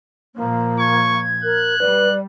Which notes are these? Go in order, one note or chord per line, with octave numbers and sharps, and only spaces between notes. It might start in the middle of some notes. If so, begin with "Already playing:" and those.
A#2 F3 A#3
C#6 G#6
A#4 F#6
G3 B4 D5